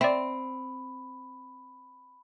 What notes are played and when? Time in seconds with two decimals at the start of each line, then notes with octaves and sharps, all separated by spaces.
0.01 C4 D5 E5 B5